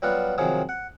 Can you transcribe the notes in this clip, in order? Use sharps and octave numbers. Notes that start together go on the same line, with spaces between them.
F#3 G3 B3 F4 F#4
C3 D#3 F3 F#3 G#4
F#5